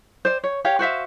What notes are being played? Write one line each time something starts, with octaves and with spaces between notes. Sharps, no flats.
C5 D5
C#5
G4 C#5 F5
F#4 C5 E5 F5